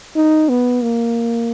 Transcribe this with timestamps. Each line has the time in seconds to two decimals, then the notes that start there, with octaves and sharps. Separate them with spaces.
0.16 D#4
0.49 B3
0.82 A#3